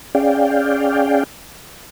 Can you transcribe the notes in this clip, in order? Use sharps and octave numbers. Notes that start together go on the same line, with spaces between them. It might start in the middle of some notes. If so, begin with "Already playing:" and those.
C#4 G#4 D5 F5 G5